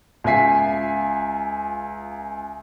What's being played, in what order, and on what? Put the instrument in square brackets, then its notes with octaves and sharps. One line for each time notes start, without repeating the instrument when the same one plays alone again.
[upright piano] C#2 F4 E5 G#5 B6 C7